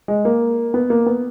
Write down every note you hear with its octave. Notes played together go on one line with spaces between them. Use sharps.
G#3
A#3
B3
A#3
B3